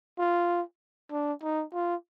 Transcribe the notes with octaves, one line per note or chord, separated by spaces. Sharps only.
F4
D4
D#4
F4